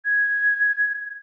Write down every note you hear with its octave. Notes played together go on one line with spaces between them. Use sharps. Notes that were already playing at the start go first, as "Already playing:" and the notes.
G#6